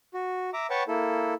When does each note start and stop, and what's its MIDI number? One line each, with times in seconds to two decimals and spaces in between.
0.14 0.50 66
0.54 0.67 76
0.54 0.67 82
0.54 0.67 86
0.70 0.83 71
0.70 0.83 73
0.70 0.83 78
0.70 0.83 79
0.70 0.83 81
0.70 0.83 85
0.88 1.34 58
0.88 1.34 64
0.88 1.34 69